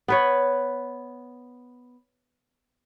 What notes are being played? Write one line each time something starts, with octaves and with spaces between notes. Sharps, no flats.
B3 B4 C#5